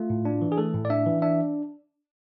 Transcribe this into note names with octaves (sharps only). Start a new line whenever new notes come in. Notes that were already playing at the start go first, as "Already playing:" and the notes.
Already playing: A3 F4
A2
D4
E3
G#4
A3 A4
A2
D5
D4 E5
E3
D4 E5